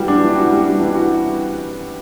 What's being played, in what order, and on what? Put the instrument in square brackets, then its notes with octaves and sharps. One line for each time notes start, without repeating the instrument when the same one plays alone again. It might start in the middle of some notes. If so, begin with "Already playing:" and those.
Already playing: [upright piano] E3 G3 F#4
D4
E3
F#4
G3
D4
E3
F#4